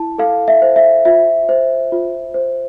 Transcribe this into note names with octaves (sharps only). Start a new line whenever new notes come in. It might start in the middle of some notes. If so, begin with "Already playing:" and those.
Already playing: E4 A5
A4 F5
E5
C5
E5
F4 E5
C5
F4
C5